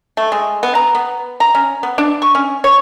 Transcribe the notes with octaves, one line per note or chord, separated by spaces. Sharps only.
A3
G#3
B3
A#5
B3
A#5
C#4
B3
D4
C#6
C#4
C#5